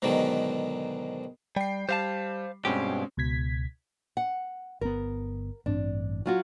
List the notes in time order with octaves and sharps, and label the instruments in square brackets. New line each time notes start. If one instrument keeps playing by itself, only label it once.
[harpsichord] G#2 B2 D3 D#3 F#3
[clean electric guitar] G3 [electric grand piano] G5 C7
[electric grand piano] G3 [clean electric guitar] C5 F5 A5
[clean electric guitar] G2 B2 G4 [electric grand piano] G#3 C4 C#4
[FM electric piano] C#2 B2 G#6 B6
[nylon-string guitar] F#5
[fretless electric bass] G1 B3 [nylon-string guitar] A#4
[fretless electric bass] A1 G2 C4 [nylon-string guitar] D4
[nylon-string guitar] F#3 F4 F#4